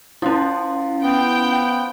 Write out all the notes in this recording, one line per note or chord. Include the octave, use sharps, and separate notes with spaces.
F3 C#4 E4
B3 G5